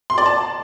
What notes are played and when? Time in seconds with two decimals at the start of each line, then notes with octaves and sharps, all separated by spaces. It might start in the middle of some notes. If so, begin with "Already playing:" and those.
0.10 C6
0.18 D5
0.26 A5